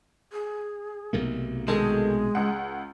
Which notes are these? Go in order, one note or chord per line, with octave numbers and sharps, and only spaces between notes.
G#4
B1 C3 A3 A#3
D#3 G#3 G#4 A4
C#2 F#5